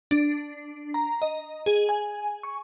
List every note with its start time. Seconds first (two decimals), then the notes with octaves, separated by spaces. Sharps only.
0.11 D4
0.94 A#5
1.22 D#5
1.66 G#4
1.89 G#5
2.43 C#6